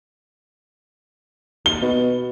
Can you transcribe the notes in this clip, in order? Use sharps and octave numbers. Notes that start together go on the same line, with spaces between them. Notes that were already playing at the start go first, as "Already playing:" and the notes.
D#2 G7
B2